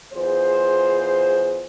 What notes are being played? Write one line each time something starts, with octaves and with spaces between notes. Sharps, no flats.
E2 F4 G#4 C5